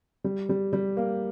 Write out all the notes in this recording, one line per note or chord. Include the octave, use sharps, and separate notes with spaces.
G3
G3
G3
A#3